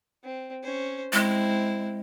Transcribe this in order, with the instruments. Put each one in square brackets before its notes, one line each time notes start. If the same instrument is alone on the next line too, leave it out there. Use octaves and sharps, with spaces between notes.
[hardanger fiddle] C4
C#4 C5
[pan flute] G#3 [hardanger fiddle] C4 E4